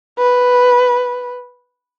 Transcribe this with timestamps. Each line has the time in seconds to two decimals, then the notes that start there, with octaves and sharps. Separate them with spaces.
0.18 B4